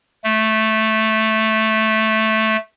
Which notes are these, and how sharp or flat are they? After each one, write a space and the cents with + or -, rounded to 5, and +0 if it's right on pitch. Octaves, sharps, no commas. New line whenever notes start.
A3 -5